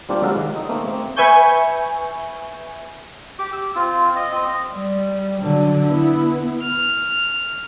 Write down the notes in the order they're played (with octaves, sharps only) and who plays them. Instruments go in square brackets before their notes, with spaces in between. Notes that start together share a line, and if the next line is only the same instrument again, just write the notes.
[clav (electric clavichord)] G3 A#3 C4 D4 F4 G4
F#3 G#3 F4 A4 F5 F#5
D#3
D#4
A3 A#3 C4
C4
[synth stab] B4 E5 G#5 C#6 G6
[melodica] G4 D6
E6
C4 F4
D#5
C4 D#5
[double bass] G3
D3 F#3
B3 E4
[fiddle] F6